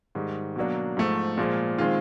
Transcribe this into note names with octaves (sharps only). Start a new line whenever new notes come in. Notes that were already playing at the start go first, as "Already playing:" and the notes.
G#2 D#3 G3
B2 F#3 A#3 D4
G#2 F3 A3
A#2 F3 G#3
D#3 G#3 C4 F4